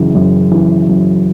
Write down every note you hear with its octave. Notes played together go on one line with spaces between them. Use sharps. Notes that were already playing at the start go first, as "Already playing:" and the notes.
Already playing: F#2 C#3 E3
F#2
C#3 E3
F#2